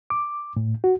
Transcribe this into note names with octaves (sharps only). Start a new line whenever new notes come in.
D6
A2
F#4